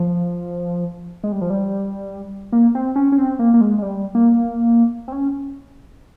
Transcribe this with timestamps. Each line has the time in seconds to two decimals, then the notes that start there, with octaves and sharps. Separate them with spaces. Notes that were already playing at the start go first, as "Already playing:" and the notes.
Already playing: F3
1.24 G#3
1.32 G3
1.41 F3
1.50 G3
2.52 A#3
2.75 C4
2.96 C#4
3.12 C#4
3.18 C4
3.39 A#3
3.54 A#3
3.61 G#3
3.78 G#3
3.82 G3
4.15 A#3
5.08 C4
5.12 C#4